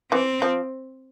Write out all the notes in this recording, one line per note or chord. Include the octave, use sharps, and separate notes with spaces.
E3 C4
F3